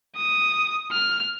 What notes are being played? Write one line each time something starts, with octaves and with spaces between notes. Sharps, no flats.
D#6
F6